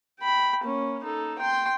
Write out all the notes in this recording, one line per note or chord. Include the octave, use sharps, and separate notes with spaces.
G5 B5
A#3 C#4
D#4 A4
G5 C6